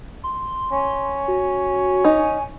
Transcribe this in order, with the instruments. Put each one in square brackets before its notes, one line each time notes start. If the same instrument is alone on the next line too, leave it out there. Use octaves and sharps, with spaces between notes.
[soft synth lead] C6
[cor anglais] C#4
[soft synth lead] F#4
[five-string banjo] D#4 [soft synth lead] G#5